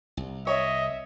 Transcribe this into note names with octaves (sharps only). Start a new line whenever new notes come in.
C2
C#5 D#5 E5